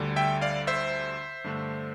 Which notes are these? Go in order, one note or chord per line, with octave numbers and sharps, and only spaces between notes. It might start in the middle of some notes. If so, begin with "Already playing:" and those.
Already playing: D2 D3 G3
E5 G5
D5 F5
C5 E5
G2 D3 A3 D4